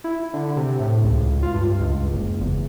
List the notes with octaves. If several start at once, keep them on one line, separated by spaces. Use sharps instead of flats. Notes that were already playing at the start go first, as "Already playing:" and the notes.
E4
D3
C3
A2
C#2
F4
G2
C#2
F#1
E2